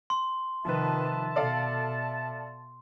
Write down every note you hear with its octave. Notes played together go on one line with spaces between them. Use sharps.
C6
C3 D#3 F3 B4 E5 A5
B2 A4 D5 F5